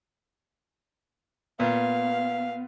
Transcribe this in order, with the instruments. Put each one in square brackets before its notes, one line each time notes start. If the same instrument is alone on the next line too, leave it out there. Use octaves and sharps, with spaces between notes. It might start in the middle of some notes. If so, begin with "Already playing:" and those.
[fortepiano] A#2 [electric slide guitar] B3 [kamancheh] F5